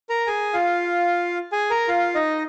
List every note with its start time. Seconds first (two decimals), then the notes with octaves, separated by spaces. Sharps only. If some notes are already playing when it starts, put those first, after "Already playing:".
0.09 A#4 A#5
0.27 G#4 G#5
0.54 F4 F5
1.52 G#4 G#5
1.70 A#4 A#5
1.88 F4 F5
2.15 D#4 D#5